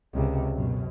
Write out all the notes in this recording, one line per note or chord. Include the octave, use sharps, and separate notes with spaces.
C#2 C3
F#2 B2